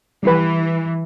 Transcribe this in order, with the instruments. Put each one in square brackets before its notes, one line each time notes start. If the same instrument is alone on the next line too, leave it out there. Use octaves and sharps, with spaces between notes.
[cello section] E3 [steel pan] G3 B4